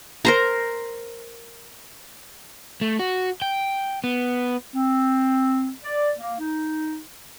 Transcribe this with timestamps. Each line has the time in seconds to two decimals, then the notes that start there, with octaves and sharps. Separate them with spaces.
0.25 A#4 C5 A#5
2.81 A3
2.99 F#4
3.42 G5
4.04 B3
4.74 C4
5.84 D5
6.19 A#3
6.39 D#4